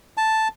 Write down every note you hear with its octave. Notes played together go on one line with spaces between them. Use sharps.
A5